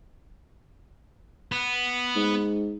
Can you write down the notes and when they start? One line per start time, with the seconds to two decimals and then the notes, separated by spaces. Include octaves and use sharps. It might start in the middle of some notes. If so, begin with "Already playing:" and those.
1.52 B3
2.15 G#2